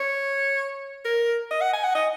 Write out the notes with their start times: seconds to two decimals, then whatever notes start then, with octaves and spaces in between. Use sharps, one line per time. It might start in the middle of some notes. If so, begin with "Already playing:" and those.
Already playing: C#5
1.05 A#4
1.51 D#5
1.61 F#5
1.73 G#5
1.84 F#5
1.95 D#5